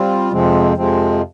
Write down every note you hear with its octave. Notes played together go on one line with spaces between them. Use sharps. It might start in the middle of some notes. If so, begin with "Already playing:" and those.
Already playing: G3 C4 F4
F2 C3 F3 G#3 C4
F2 C3 F3 G#3 C4